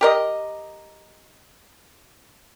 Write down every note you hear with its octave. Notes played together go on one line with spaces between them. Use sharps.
G4 A#4 D#5